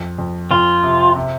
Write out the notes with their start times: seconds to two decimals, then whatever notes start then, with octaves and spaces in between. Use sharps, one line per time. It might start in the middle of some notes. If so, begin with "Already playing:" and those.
Already playing: F2
0.18 F2
0.51 F2 F4
0.83 C3
1.16 C3